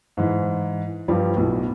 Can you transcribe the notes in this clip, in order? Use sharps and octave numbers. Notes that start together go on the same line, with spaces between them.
G#2 E3
G2 F3 G3
B1 A2